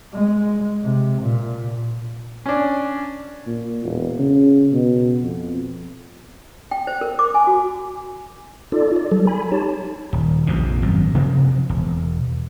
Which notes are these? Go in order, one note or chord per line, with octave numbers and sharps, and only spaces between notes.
G#3
C3
A#2
C#4 D4
A#2
E1
C#3
B2
F2
G5
C5
A#4
D6
G#5
F#4
D#4 F4 A4 D5
D5
F#3 G3 A4
G#5 B5
D#4 G4 C#5 A5
D#1
A#1 F2 C3
G#1 F#2 B2 F#3
C3 F3 A#3 C4
E1